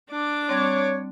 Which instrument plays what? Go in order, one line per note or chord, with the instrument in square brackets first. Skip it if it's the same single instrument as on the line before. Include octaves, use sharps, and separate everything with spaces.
[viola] D4 D6
[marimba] G3 C4 [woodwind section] C#5